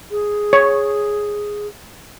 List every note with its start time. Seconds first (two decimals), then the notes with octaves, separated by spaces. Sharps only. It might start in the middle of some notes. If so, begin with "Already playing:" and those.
0.11 G#4
0.53 C#5